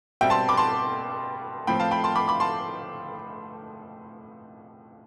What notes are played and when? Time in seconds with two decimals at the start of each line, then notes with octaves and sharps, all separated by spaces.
0.21 B2 G3 C4 E5 G5
0.30 A5 C6
0.48 B5 D6
0.57 A5 C6
1.67 A2 F3 C4 G5 B5
1.80 F5 A5
1.91 G5 B5
2.04 A5 C6
2.16 B5 D6
2.28 B5 D6
2.40 A5 C6